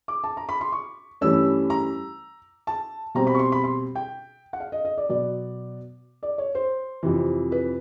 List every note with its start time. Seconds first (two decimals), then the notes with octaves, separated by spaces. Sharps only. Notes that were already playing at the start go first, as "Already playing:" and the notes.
0.08 D6
0.24 A5
0.37 A#5
0.49 B5
0.61 C6
0.72 C#6
1.21 G2 E3 A3 C#4 E6
1.70 A#5
2.67 A5
3.15 B2 G3 C4 A#5
3.27 B5
3.34 C#6
3.39 C6
3.52 B5
3.64 C6
3.95 G5
4.53 F#5
4.60 F5
4.72 D#5
4.85 D#5
4.98 D5
5.09 B2 F#3 B3 D5
6.23 D5
6.38 C#5
6.55 C5
7.03 F2 C3 E3
7.52 B4